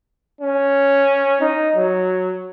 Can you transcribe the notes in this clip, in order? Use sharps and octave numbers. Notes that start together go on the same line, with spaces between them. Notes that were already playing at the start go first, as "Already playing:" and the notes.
C#4
D#4
F#3